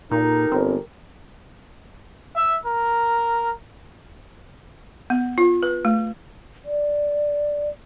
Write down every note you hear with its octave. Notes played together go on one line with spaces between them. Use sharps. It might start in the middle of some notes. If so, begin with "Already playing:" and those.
A#2 D#4 G4 A4 A#4
G1 C4
E5
A#4
B3
F4
B4
A3
D5